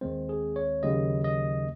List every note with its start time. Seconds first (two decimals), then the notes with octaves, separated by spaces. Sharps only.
0.01 D#2 D#3 G#3 C4 C5
0.29 G#4
0.56 C#5
0.83 D#2 C#3 F#3 D#5
1.24 D#5